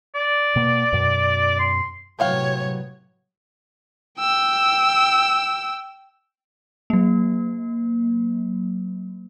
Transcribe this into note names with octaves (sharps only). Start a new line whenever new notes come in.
D5
B2 A#3
F#2 B2
C6
A2 C3 F#3 B3 C#5 F5 G5
G5 E6
F#3 A#3